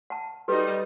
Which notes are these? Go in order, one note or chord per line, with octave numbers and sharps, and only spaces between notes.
F#5 A5
G3 D#4 F#4 A4 B4